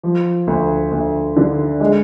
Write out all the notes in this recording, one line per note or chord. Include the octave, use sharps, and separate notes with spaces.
F3
D2
D2
D3
G#3